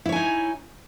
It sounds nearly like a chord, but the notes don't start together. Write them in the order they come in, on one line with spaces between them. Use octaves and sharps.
E4 C#5 G#5 D#4